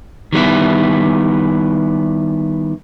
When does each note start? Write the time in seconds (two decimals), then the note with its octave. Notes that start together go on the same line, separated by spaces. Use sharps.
0.33 D#3 G3 B3 E4